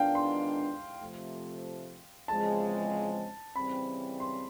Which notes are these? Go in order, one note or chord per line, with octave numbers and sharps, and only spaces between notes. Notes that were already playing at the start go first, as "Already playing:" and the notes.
Already playing: D#3 G#3 B3 D4 F4 F5 G5
C6
C3 F3 A3
E2 C#3 F3 G#3 C4 A5
C#3 E3 G3 C4 B5
C6